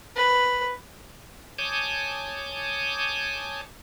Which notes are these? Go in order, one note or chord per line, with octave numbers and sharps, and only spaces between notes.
B4
C#5 G#5 A5 D6 D#6 G6